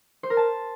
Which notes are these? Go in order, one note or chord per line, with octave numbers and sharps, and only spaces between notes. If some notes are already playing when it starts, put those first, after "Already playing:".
C5
A#4
A5